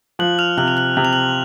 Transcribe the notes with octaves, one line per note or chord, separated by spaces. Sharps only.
F3 F#6 F#7
F6 F7
C3 F#6 F#7
F7
F#6 F#7
C3 F#7
F7
F#6 F#7